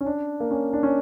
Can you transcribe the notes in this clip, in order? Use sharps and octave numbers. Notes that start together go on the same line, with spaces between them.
C#4
D4
A#3
C#4
D4
C#4